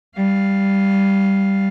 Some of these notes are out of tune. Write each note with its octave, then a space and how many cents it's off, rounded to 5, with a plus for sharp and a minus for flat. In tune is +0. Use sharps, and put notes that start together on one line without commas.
G3 +0 F5 +0